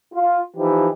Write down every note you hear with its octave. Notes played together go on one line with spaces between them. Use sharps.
F4
E3 F3 D#4 G4